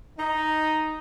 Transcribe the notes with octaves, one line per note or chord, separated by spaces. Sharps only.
D#4